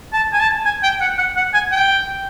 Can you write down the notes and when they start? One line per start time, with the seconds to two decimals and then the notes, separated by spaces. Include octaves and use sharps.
0.13 A5
0.33 G#5
0.40 A5
0.65 G#5
0.83 G5
1.01 F#5
1.18 F#5
1.36 F#5
1.54 G#5
1.72 G5